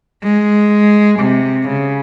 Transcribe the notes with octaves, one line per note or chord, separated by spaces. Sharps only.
G#3
C3
C#3